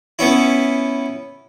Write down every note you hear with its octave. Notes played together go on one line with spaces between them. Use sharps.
B3 C#4 E4